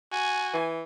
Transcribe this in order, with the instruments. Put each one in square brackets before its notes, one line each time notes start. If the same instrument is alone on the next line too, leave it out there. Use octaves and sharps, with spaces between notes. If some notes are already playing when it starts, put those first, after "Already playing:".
[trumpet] F#4 [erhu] G#5
[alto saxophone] E3